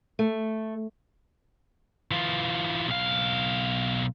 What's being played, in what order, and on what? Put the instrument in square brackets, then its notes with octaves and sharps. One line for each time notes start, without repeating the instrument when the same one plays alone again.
[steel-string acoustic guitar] A3
[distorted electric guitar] E3 F4
B1 F5